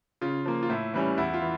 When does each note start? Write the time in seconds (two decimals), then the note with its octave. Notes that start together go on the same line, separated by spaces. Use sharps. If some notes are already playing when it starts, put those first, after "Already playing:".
0.21 C#3 F4
0.46 F3 A#3
0.63 F4
0.69 A2 E4
0.93 E3 G3 C#4
1.18 E2 E4
1.34 F4
1.42 E3